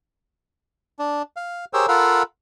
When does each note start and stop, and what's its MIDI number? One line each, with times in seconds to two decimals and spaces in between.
0.99 1.22 62
1.36 1.65 77
1.73 1.86 67
1.73 1.86 68
1.73 1.86 70
1.73 1.86 72
1.73 1.86 73
1.73 1.86 88
1.88 2.23 65
1.88 2.23 69
1.88 2.23 70
1.88 2.23 77
1.88 2.23 78
1.88 2.23 83